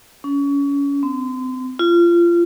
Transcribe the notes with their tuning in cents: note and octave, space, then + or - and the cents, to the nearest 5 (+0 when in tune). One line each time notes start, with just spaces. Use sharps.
C#4 +30
C4 -35
F4 -25